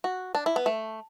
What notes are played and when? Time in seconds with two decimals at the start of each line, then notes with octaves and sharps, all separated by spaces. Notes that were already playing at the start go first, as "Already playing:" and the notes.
0.04 F#4
0.35 D4
0.46 E4
0.56 B3
0.66 A3